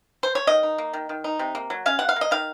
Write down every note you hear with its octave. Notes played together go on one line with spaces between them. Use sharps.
C5
C#5
D#3 D#5
D#4
A#3
D#3
D#3
D#4
C3
A#3
F#3
C#4 F5
C3 F#5
F5
A#3
D#5
D#3 F5